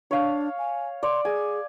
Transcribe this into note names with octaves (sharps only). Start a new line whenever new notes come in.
D4 C#5 F5
G#5
D5 C6
G#4 G#5